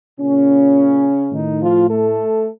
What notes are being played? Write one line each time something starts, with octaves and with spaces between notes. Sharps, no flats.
A#2 C#3 C#4
A2 D#3 D#4
F3 F4
A3 A4